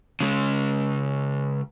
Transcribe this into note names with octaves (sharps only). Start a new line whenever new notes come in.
C#3 G#3